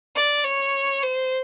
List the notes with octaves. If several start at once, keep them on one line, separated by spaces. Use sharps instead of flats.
D5
C#5
C5